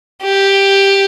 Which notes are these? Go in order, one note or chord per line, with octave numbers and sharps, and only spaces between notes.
G4